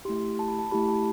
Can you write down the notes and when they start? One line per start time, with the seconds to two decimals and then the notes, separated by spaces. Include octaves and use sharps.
0.05 A3 E4 G4 C6
0.39 A5
0.48 B5
0.59 A5
0.71 A3 E4 G4 B5
0.88 A5